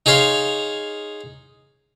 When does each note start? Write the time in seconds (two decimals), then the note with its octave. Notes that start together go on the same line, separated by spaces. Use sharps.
0.06 D#4 G#4 C#5 F5 C6